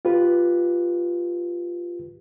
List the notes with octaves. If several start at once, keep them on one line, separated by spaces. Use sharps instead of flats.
F4 G4 B4